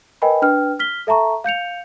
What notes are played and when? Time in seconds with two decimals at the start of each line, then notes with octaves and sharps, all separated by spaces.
0.22 A#4 B4 D#5 G5 G#5 B5
0.42 D4 B4 G5 F6
0.79 F6 B6 G7
1.07 A4 E5 A5 A#5 C#6
1.44 F5 G6 C#7 F7